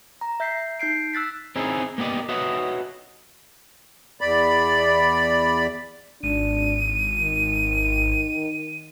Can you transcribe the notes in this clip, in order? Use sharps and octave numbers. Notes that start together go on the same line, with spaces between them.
A#5
E5 G6 B6 C7
D#4 G6 C7 D7
E6 F#6 A6 B6
C4 C#4 D#4 E4 G#4
A#3 B3 G4 D5 D#5
F#4 B4 C#5 D#5 E5 F#5
E2 D5 B5
G#1 D4 D#7
D#3